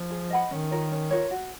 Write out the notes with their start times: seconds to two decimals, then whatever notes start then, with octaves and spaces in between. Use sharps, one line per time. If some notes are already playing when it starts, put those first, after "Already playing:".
Already playing: F3
0.10 G#4
0.30 D#5 F#5 B5
0.50 D#3 C#4
0.71 F4 A#4 C#5
0.91 C#4
1.10 F4 A#4 C#5
1.31 F#4